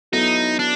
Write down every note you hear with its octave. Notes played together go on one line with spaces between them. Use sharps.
F#3 B3 D#4 E4 A4
D4